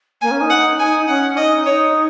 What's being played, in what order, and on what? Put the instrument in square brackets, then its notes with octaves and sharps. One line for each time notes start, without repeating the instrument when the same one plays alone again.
[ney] A#3 [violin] G#5
[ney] C#4
D#4
[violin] F#5
G#5
[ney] C#4 [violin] F#5
[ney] D#4 [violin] D#5
[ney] D#4 [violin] C#5